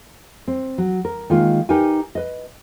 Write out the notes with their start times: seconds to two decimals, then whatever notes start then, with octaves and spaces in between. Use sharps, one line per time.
0.48 C4
0.78 F#3
1.05 A#4
1.30 D#3 G#3 A#3 F4
1.69 D#4 G4 A#4 B4 G5 G#5
2.15 B4 D#5